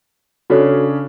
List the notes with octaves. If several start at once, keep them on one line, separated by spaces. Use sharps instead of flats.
C#3 C#4 D4 F#4 A4 C#5